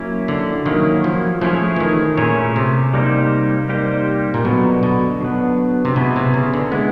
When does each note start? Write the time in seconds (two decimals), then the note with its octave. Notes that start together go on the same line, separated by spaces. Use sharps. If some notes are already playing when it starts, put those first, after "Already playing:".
Already playing: F#3 A#3 C#4 E4
0.28 D3
0.66 D#3 F#3 A#3 C#4 E4
1.04 F3
1.41 F3 A3 C#4 E4 G#4 C#5
1.76 E3
1.80 D#3
2.17 A#2 A3 C#4 E4 G#4 C#5
2.56 C3
2.94 G3 A#3 D#4 G4 C5
3.69 G3 A#3 D#4 G4 C5
4.34 A#2
4.45 B2 D3 F#3 B3
4.83 B2
5.21 D3 F#3 B3
5.85 C3
5.96 B2 B3 E4 G#4
6.16 C3
6.34 C#3
6.54 D3
6.72 G#3 B3 E4